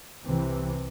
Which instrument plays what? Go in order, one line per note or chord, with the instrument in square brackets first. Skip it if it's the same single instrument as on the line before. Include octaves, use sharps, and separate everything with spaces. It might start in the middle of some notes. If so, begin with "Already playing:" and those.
[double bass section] C2 C3 E3